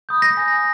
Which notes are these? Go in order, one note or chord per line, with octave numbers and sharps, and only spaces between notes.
B5 D#6 G6
A#6
G#5